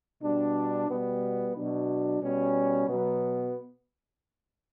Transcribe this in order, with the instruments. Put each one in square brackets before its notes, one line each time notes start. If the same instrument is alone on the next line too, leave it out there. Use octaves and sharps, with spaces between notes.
[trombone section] B2 G3 D4
B2 G3 B3
B2 F#3 D4
B2 G3 C#4
B2 F#3 B3